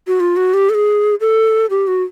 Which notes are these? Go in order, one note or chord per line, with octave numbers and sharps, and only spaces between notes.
F#4
F4
F#4
G4
A4
G#4
A4
G4
F#4